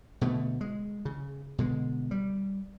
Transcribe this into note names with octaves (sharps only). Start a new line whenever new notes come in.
B2 D3 A3
G#3
C#3
B2 D3 G#3
G3